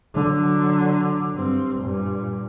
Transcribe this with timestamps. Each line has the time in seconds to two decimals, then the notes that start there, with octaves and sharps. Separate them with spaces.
0.14 D3 F#3
1.35 G2 C4
1.79 G2 A#2